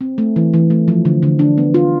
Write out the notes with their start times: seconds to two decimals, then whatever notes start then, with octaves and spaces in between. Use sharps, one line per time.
0.01 C4
0.18 A3
0.36 E3
0.54 E3
0.70 A3
0.88 F3
1.05 D3
1.23 D3
1.39 D4
1.58 B3
1.74 F4